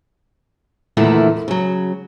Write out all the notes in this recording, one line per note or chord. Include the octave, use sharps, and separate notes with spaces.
E2 A#2 D3 D#3 A3 E4
C#3 F#3